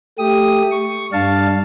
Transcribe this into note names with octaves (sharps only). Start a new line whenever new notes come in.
A3 G4 D#6
C#6
G2 D4 F5 A5